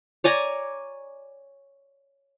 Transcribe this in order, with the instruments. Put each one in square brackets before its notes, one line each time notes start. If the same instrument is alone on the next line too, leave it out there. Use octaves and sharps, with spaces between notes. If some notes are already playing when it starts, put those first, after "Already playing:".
[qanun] C#5 D5 G#5 A#5